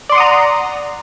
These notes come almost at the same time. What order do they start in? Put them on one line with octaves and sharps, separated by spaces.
D5 C6 F#5 D#6 A#5